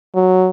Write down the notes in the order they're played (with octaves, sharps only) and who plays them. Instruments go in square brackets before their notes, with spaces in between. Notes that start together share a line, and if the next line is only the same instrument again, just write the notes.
[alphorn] F#3